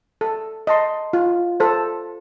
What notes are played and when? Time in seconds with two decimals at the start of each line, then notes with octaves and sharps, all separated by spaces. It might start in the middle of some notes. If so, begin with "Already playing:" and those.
0.21 A4
0.67 D#5 A5 C6
1.13 F4
1.60 A4 C5